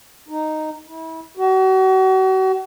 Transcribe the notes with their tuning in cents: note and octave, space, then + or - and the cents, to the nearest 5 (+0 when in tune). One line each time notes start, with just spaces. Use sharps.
D#4 -5
E4 -30
F#4 +35